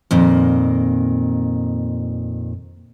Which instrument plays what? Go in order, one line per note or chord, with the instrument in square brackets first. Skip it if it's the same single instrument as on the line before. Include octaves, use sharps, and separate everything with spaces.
[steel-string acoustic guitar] F2 A#2 D#3